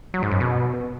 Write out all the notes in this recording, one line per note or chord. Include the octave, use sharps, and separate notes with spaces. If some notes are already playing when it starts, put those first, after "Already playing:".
F#3
G#2
F#2
B2